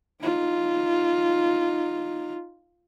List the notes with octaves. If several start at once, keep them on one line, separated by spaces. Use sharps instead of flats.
D#4 F4